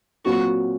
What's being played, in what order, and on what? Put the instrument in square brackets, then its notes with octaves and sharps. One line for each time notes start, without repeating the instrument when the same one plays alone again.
[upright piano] A#2 F#3 C4 F4 [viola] F#4